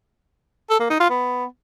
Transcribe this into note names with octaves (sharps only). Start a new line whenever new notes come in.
A4
A#3
D#4
F4
B3